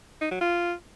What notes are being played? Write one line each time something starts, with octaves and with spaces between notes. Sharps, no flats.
D#4
F#3
F4